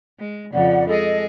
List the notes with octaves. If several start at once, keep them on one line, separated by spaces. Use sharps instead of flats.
G#3
F2 C#3 F3 D5 F#5
G#3 G#4 A4 D#5